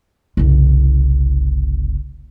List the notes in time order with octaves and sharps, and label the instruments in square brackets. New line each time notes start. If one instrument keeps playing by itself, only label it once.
[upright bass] F#1 C2